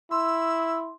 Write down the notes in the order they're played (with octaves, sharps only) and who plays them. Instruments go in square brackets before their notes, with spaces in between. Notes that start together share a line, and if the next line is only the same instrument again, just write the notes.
[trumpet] E4 [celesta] C6 [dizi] E6